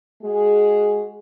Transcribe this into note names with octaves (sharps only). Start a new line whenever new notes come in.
G#3 F#4 G#4